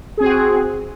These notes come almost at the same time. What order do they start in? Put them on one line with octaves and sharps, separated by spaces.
G#4 C4 F#4